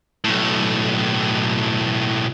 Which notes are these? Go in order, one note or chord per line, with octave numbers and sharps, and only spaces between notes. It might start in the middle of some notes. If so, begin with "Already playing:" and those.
B1 A2